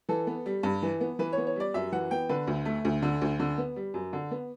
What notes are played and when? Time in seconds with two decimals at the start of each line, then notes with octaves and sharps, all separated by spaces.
0.09 E3 A4
0.27 B3
0.46 G3
0.63 G2
0.83 E3
1.01 B3
1.19 E3 B4
1.33 B3 C#5
1.47 C#5
1.56 G3 D5
1.74 F#2 E5
1.92 E3 F#5
2.11 B3 G5
2.29 D3 B4
2.47 D2
2.65 A3
2.85 D2
3.02 D3
3.22 D2
3.40 D3
3.58 B3
3.76 G3
3.94 F#2
4.13 D3
4.31 B3